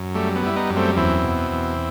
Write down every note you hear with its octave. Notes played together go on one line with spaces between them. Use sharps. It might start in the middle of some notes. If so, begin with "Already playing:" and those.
Already playing: F#2
G3 A3
B3
G3 E4
B3 D#4
F#2
A3 C4
E2 C4 E4
B2
E2